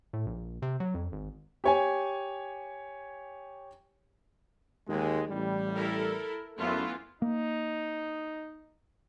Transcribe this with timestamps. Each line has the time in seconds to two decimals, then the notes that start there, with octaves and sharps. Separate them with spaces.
0.13 A2
0.26 A#1
0.62 C3
0.80 F#3
0.95 F2
1.12 G#1
1.64 G4 C#5 G#5
4.88 D#2 G#3
5.28 A1 G3
5.76 E4 A4 A#4
6.59 F#2 E3 A3 B3 F4
7.22 A#3 D#4